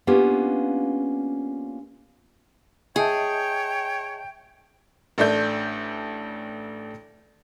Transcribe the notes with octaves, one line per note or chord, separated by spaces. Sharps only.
A#3 B3 C#4 D4 F4 G4
G#4 C#5 D#5 E5 G5 A5
A1 A3 D4 E5 G6